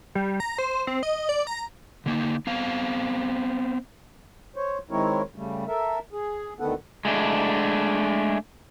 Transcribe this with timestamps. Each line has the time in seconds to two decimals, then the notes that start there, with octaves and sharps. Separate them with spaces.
0.15 G3
0.40 A#5
0.58 C5
0.87 C4
1.03 D#5
1.29 D5
1.47 A#5
2.06 D3 A#3 D#4
2.47 B3 C4 F5
4.56 C5 C#5
4.91 D#3 G#3 C4 E4 A#4 C#5
5.36 C#3 G3 A3
5.68 A4 A#4 E5
6.13 G#4
6.60 D2 D3 D#3 B3 A4 F#5
7.05 G#3 A3 D4